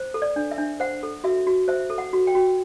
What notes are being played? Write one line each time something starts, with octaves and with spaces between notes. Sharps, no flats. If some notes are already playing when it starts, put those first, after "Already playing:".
Already playing: C5
A4
D5
D4
E5
D4
C5 F#5
A4
F#4 E5
F#4
C5 E5
A4
F#5
F#4
G5
F#4